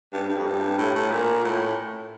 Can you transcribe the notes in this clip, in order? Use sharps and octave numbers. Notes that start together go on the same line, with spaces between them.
G2
G2
F2
G2
A2
A2
A#2
A2